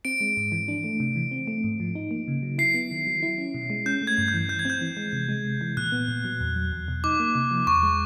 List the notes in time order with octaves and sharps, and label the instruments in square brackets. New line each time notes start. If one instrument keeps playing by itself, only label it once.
[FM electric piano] C4 [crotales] D7
[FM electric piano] G#3
G#2
E3
D4
A3
C3
E3
C4
A3
G#2
F3
D#4
A#3
C#3
F#3
[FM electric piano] E4 [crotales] C7
[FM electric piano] B3
D#3
F#3
E4
C#4
B2
G#3
[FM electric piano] C#4 [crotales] G6
[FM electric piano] A3
[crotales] G#6
[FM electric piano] G2
[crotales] G6
[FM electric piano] E3
[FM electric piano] E3 [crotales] G6
[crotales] G#6
[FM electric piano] C4 [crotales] G6
[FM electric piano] E3
G#3
C3
G#3
C3
E3
[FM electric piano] A#2 [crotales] F#6
[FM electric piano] B3
A#2
F#3
E2
F#3
E2
B2
[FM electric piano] D#4 [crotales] D6
[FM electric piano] A#3
C3
F3
[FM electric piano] E2 [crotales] C#6
[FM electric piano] G#3